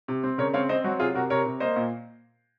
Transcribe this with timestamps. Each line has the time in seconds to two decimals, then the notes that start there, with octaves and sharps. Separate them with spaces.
0.08 C3
0.23 C4
0.38 C#3 A#4 C#5
0.54 C4 C#5 F5
0.69 C4 C5 D#5
0.84 F#3 F#4
0.99 C3 F4 G#4
1.15 C3 F#4 A#4
1.30 C3 A#4 C#5
1.46 C3
1.60 A#3 C5 D#5
1.76 A#2